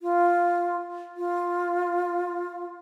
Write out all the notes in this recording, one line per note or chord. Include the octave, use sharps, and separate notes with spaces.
F4
F4